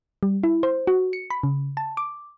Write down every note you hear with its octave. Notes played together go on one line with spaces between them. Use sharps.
G3
E4
C5
F#4
C#7
B5
C#3
A5
D6